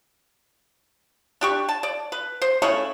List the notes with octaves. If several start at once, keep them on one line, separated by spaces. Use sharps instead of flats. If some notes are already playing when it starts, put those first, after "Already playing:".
D4 G4 C#6
A5
D5
B4
C5
C#3 A3 C#4 E4